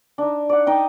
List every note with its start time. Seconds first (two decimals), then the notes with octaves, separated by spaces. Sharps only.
0.18 D4 D#4
0.49 D5 F#5
0.66 D#4 D#5 G5